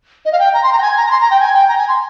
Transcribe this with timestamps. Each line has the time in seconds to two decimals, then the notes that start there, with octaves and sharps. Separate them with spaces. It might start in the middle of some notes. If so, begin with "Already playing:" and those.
0.25 D#5
0.32 F5
0.39 G5
0.54 A#5
0.63 C6
0.73 A#5
0.78 G5
0.82 G#5
0.97 A#5
1.07 A#5
1.11 C6
1.21 A#5
1.31 G5
1.40 G#5
1.54 G5
1.69 A#5
1.78 G#5
1.88 C6